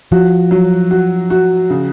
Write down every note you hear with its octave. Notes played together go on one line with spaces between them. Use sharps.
F3 F#4
F#3
F#4
F#4
C#3